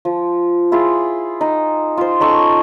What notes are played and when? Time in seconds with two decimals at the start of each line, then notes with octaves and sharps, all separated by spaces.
0.05 F3
0.72 E4 F4 G#4
1.41 D#4
1.97 F4 C5
2.20 C#4 D#4 A4 C#6